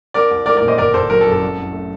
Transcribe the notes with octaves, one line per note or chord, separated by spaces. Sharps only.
C2 A#4 D5
C2
A3 A#4 D5
A#2 A#4 D5
C5 D#5
G1 A#4 D5
G1 A4 C5
F#3 A#4
A4
F#2
A4
C2
C2
A3